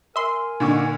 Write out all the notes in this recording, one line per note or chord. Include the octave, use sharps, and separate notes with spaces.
A#4 E5 G#5 C6
A#2 D3 D4 D#4 C#6 D6